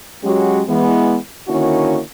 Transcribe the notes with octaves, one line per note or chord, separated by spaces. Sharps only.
F#3 G#3 C#4 F#4 G4
E3 G#3 B3
D3 D#3 A#3 C#4 E4 F#4